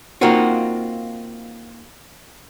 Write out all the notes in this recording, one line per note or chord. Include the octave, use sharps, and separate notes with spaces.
A#3 C4 D#4 F4 F#4